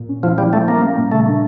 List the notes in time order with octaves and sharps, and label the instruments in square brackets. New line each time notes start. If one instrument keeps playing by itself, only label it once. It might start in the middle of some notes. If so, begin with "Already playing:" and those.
Already playing: [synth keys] A#2
C#4
[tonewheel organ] F3 [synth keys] E4
[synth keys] F3 [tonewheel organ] G3
[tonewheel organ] A3 [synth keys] C#4
[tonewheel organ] A#3 [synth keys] C#4
[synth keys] G3
A#2
[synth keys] C#3 [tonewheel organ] A3
[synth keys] D4